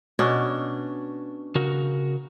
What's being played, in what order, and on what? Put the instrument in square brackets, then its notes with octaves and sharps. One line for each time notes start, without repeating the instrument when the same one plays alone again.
[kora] B2 C#4 D4
[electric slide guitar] C#3 F#4 A#4